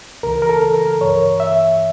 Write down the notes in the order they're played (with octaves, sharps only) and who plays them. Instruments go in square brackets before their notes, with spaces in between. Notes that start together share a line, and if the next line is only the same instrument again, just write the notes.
[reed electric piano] C#2 C#3 E3 A#4
A#4
A4
A#4
G2 E3 C#5
E5